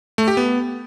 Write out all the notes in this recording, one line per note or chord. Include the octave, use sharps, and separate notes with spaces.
A3
G4
B3